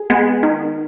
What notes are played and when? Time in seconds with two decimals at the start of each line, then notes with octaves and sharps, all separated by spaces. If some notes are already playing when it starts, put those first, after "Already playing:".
Already playing: G#4
0.10 G#3 B3
0.43 D#3